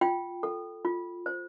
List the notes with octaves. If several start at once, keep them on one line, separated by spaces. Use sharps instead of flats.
F4 G5
A4
F4
C5